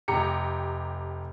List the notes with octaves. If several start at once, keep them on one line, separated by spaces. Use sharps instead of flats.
F1 G4 A#5 C#7